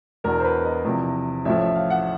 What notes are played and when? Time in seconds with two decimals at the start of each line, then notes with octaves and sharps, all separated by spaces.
0.24 E1 E2 B2 A#4
0.40 C5
0.44 B4
0.65 D#5
0.85 E2 C3 F3
1.45 A1 A2 F3 E5
1.60 E5
1.75 F5
1.90 F#5